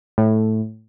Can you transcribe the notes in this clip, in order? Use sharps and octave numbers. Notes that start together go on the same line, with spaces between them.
A2